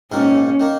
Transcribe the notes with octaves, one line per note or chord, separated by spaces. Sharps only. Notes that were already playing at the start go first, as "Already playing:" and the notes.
A#1 G#2 D#3 A#3 C#4
D#3 A#3